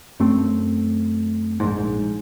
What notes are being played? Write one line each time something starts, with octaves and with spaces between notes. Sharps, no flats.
F#2 A3 C4
A#1 G#2